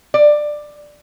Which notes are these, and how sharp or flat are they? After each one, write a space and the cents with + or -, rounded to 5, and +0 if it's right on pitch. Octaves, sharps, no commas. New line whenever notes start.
D5 +15